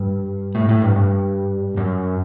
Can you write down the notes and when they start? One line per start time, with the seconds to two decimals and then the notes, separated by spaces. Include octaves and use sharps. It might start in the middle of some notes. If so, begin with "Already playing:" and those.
Already playing: G2
0.55 A2
0.69 A2
0.82 G2
0.96 G2
1.77 F#2